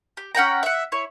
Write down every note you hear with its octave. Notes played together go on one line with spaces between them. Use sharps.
G4
C#4 F#5 G5 A#5
E5 F#5
E4 C#5